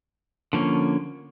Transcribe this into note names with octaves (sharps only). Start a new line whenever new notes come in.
D3 F3 A#3 C#4